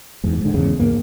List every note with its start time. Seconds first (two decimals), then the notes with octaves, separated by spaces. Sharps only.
0.24 E2 G#2
0.41 G#2 D3
0.54 E2 C#3
0.80 C#2 G2 A#3